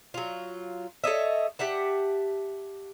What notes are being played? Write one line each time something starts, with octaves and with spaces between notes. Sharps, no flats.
F#3 F4
A4 C#5 D#5 E5
G4 E5 F#5 A5